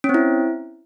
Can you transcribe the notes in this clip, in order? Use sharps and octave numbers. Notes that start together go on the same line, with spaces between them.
C#4
C4
E4